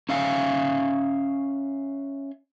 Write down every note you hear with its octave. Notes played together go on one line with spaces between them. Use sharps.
C#4 E5 F5 G#5